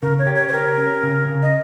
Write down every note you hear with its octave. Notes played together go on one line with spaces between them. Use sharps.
C#3 A#4
C#5
G4
C#5
C5
G4 A#4
C#4
C#3
C#3
D#5